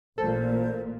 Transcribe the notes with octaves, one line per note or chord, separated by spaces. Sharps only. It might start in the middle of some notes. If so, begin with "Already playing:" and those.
A1 A#2 A4 C5